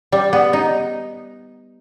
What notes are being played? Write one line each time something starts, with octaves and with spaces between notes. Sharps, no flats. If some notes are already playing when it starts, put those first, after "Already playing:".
G3
B3
D#4